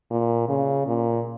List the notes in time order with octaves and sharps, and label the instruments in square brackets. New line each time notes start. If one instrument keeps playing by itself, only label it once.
[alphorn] A#2
C#3
A#2